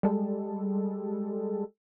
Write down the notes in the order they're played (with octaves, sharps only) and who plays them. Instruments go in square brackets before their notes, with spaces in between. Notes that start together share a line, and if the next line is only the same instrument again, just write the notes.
[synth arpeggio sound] G3 G#3 A4